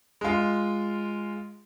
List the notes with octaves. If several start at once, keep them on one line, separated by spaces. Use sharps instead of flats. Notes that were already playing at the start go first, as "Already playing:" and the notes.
G#3 F4